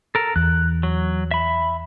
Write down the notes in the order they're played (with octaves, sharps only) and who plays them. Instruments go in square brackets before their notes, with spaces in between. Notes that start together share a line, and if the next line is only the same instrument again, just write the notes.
[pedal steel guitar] A4 A#4
[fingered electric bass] E2 [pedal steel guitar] F#6
[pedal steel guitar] F#3
E5 B5